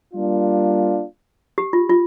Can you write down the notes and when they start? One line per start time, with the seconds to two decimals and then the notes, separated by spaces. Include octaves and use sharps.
0.14 G3 A#3 D4 F4
1.58 G4
1.73 F4
1.90 F4